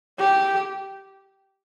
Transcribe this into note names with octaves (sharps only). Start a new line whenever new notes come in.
G4